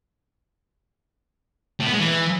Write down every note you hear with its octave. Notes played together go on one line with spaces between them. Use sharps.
A2
B3
G#3
E3